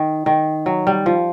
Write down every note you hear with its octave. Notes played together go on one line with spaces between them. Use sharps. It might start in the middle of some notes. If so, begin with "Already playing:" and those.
Already playing: D#3
D#3
F#3
G3
F3